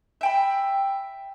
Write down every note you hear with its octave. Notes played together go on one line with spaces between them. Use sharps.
E5 G5 B5